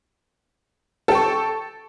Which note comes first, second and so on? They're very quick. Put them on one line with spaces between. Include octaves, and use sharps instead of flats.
A4 G5 C#6